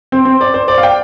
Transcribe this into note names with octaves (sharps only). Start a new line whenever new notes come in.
C4
C4
D5
C5
D5
F5
G5